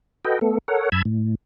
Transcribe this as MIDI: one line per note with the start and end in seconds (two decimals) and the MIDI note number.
0.25 0.39 66
0.25 0.39 69
0.25 0.39 71
0.25 0.39 75
0.25 0.39 79
0.41 0.58 57
0.41 0.58 59
0.41 0.58 69
0.68 0.89 69
0.68 0.89 70
0.68 0.89 73
0.68 0.89 78
0.92 1.02 42
0.92 1.02 81
0.92 1.02 83
0.92 1.02 88
0.92 1.02 92
1.05 1.35 45